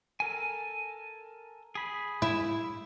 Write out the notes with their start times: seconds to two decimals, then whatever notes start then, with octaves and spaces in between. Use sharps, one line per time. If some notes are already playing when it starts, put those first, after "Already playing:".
0.20 A4 A#4 G#5
1.75 G#4 B5
2.22 E4